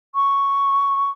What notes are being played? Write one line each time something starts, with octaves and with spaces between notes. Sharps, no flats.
C#6